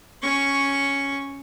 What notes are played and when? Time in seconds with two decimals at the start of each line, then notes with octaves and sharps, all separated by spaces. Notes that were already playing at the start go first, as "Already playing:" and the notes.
0.22 C#4 C#6